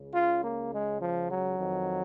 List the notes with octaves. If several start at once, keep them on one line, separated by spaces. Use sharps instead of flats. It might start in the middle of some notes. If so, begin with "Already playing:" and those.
Already playing: C#2 C#3
F4
A#3
G#3
F3
F#3
F2 D#3